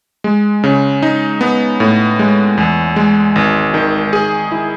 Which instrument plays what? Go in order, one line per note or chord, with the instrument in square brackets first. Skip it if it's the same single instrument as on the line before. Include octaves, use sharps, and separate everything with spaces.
[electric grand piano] G#3
C#3
D#4
B3
A2
G#3
E2
G#3
G#1
D#3
G#4
E4